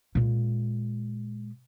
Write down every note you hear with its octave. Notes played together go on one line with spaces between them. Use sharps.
A#2 G#3